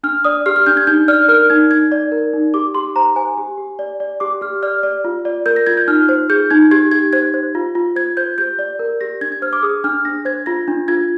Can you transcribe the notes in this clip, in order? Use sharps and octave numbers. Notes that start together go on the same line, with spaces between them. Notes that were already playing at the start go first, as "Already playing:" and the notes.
D4 F6
D5 D#6
G4 F6
F6
D4 G6
G#6
D#4 G6
D5 F6
A#4 F6
D#4 G#6
D#4 G#6
D5
A#4
D#4
G4 D6
G4 C6
C5 A#5
C5 G#5
G4
G4
D5
D5
G4 D6
G4 F6
D5 F6
D5
F4
D5
A#4 G6
A#6
F4 G#6
G6
D#4 F6
C5
G#4 G6
D#4 G#6
G4 G#6
G4 G#6
C5 G#6
C5
F4
F4
C5 G#6
C5 G6
G4 G6
D5
A#4
G4 A#6
D4 G#6
G#6
C5 F6
D6
G#4 D#6
D4 F6
D4 A#6
C5 G#6
F4 A#6
D4
F4 G#6